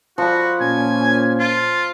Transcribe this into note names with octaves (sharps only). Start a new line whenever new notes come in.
F3 F#4 B5
A#2 C#4 G#5
F4